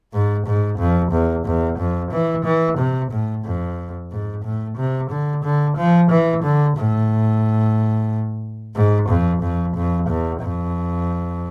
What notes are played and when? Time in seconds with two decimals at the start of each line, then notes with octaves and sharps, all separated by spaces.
0.13 G#2
0.47 G#2
0.79 F2
1.12 E2
1.46 E2
1.79 F2
2.12 E3
2.45 E3
2.78 C3
3.11 A2
3.45 F2
4.12 G#2
4.44 A2
4.77 C3
5.10 D3
5.44 D3
5.77 F3
6.11 E3
6.43 D3
6.77 A2
8.76 G#2
9.09 F2
9.42 F2
9.76 F2
10.09 E2
10.42 F2